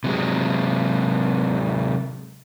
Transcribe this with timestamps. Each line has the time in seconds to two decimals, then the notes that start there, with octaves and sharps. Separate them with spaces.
0.04 C3 F#3 G#3